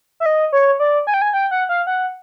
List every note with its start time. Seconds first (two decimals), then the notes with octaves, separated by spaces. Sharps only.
0.20 E5
0.26 D#5
0.52 C#5
0.80 D5
1.07 G#5
1.14 G5
1.22 G#5
1.34 G5
1.51 F#5
1.69 F5
1.87 F#5